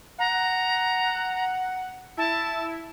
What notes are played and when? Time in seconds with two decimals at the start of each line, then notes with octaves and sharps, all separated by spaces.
0.19 F#5 A#5
2.18 E4 A5